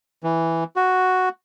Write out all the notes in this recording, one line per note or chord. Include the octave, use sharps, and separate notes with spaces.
E3
F#4